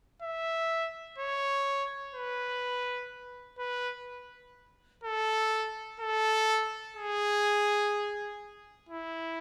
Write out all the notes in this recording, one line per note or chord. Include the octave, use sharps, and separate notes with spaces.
E5
C#5
B4
B4
A4
A4
G#4
E4